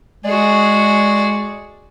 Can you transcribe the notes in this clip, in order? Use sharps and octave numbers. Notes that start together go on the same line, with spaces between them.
G#3 F#4 G#4 D5